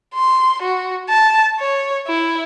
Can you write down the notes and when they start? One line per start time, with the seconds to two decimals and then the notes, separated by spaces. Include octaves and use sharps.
0.15 C6
0.62 F#4
1.09 A5
1.59 C#5
2.07 E4